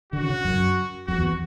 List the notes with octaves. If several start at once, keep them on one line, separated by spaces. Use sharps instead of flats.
D3 F#4
C#3
F#2
F2 F#4
E2